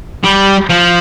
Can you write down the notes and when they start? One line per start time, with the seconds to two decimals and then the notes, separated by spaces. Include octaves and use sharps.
0.24 G3
0.69 F3